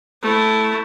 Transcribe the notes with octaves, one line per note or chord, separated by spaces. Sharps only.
A3 E4